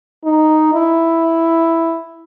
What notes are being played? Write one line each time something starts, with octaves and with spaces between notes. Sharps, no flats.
D#4
E4